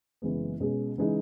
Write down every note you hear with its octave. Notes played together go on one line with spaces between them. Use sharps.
F#1 F#2 E3 G#3 B3
B2 G#3 C#4 G#4
C#3 E3 G#3 D#4